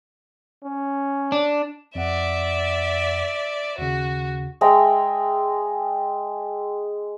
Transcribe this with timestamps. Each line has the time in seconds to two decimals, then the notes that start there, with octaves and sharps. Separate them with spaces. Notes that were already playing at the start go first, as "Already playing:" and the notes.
0.64 C#4
1.32 D4
1.95 F2 D5 E5 F#5
3.78 D#2 C#3 F#4
4.61 G#3 E5 G5 A#5